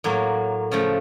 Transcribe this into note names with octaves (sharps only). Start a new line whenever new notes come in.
A2 F#3 A#3
C#3 F3 A3